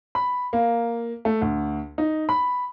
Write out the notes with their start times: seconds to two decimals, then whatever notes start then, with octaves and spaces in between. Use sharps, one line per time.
0.15 B5
0.53 A#3
1.25 A3
1.41 D2
1.98 D#4
2.29 B5